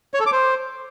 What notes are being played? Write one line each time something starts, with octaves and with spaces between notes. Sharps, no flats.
C#5
A4
D6
C5